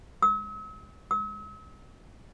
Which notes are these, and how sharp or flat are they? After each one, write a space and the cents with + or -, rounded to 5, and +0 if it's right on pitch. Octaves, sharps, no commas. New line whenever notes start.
E6 -45
E6 -45